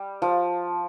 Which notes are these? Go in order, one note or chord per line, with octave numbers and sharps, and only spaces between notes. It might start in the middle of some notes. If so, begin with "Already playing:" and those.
Already playing: G3
F3